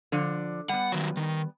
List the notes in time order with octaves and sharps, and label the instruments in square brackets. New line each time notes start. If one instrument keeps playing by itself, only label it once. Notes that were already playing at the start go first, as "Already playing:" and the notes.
[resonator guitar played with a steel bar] D3 F3 D5
[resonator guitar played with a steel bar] G3 B3 [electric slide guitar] F#5
[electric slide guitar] D#3 F#3
D#3